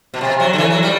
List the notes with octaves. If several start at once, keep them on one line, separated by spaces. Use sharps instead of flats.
B2
C3
F#3
D3
E3
F#3
G3